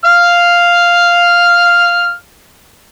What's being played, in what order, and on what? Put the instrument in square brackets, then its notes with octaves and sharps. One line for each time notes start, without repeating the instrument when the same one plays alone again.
[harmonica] F5 F6